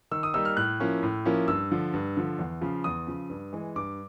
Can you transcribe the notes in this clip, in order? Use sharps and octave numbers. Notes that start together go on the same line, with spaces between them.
D#3 E6
D#6
G3 A#3 D#4 E6
F6
A2 F#6
F3 A#3 C#4 E4
A2
F3 A#3 C#4 E4
G2 E6
D3 F3
G2
D3 F3
E2
C#3 F3
E2 D#6
C#3 F3
G2
E3 G#3
G2 D6